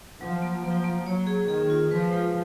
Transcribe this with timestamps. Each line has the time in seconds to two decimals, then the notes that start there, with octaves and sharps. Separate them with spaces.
0.21 F3 F#3
0.42 A#3
0.64 F3 A#3
0.84 A#3
1.06 F#3 C#5
1.27 G#4
1.48 D#3 G#4
1.70 F4
1.91 F3 B4
2.12 G#3